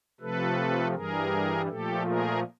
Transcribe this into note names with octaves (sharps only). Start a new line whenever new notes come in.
C3 F3 A3 A4 B4
G2 E3 G3 G#4 A#4
A#2 F3 A3 G4 A4
G#4 A#4